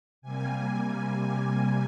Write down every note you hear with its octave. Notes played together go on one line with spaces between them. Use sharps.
C3 G3 A#3 G#5